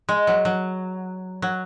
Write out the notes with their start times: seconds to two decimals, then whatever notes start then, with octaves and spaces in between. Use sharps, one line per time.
0.09 G#3
0.27 F#3
0.45 F#3
1.42 F#3